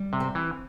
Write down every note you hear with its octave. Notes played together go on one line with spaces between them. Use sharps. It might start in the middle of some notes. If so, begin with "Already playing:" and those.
Already playing: G3
C3
C4
E3